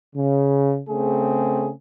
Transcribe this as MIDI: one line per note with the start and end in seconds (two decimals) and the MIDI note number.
0.15 0.80 49
0.89 1.71 49
0.89 1.71 57
0.89 1.71 60
0.89 1.71 68